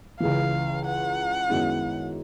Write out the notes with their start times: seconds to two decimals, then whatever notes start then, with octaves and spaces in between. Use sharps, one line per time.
0.20 C#2 C#3 E3 F5
0.85 F#5
1.49 F#2 D#3 G#3 B3 E4